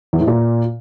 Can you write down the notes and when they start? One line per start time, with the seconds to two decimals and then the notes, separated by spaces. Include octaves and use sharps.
0.13 E2
0.20 A2
0.27 A#2